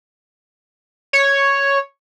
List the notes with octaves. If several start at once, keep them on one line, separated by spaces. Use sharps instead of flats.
C#5